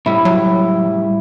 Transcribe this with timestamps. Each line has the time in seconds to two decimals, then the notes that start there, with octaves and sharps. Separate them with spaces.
0.06 A2 G3 E4
0.25 F#3